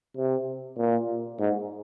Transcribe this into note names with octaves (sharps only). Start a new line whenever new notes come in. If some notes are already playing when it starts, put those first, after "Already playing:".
C3
A#2
G#2